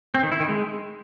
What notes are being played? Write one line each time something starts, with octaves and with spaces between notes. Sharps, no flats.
C4
D#3
E4
D#3
G#3